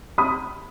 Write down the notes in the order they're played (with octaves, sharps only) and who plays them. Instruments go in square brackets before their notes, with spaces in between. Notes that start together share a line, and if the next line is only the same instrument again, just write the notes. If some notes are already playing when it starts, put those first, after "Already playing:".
[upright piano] B5 D#6